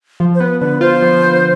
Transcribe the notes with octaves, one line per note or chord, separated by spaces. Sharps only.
F3
C5
B3 B4
D3 B4
F4 C5
F3
B3